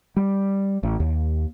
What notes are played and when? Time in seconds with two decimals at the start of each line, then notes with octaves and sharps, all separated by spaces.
0.16 G3
0.83 A1
1.00 D#2